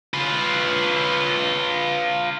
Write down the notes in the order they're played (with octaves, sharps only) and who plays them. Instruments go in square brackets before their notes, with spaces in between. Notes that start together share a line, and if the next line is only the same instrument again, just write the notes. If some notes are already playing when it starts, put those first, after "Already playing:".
[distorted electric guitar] F4 B4